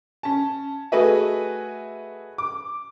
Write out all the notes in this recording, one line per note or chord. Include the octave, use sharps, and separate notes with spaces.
C#4 A5
A3 F#4 G#4 B4 D#5 E5
D6